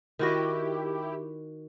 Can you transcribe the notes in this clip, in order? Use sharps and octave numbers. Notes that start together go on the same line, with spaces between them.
D#3 E4 F#4 G4 D#5